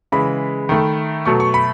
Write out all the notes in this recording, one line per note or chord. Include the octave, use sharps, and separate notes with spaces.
C#3 E3 G#3 B5
D#3 A3
B2 F#3 A3 C#6
C#6
B5